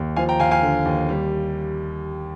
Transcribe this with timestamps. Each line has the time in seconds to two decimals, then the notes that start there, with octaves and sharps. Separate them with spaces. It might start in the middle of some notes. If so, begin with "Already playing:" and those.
Already playing: D#2
0.16 F3 F5 G#5
0.29 G5 A#5
0.40 D#2 F5 G#5
0.51 F5 G#5
0.62 D3
0.86 D#2
1.09 G3